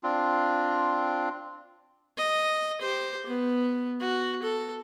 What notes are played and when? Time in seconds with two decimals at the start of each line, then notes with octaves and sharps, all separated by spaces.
0.03 C4 D4 F4
2.17 D#5
2.81 G4 C5
3.26 B3
4.01 F#4
4.43 A4